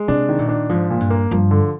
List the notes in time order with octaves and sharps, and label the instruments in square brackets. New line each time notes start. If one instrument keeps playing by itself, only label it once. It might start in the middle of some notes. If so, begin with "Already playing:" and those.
Already playing: [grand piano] G#3
[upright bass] C3 [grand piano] D4
[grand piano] D#3
[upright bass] A#2
[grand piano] D4
[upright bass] G#2 [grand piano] F3
[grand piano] A#2
[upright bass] G2
[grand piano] A#3
[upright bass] G2 [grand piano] F3
[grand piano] D3